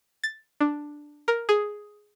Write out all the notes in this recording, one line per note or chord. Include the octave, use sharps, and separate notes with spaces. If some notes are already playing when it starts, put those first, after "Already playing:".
A6
D4
A#4
G#4